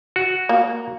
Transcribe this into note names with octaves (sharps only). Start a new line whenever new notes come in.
F#4
A#3